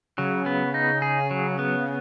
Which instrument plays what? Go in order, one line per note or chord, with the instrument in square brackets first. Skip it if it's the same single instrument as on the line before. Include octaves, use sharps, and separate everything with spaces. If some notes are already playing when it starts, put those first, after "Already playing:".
[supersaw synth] C#3 [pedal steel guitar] F#3
[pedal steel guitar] B3
D#4
G#4
F#3
B3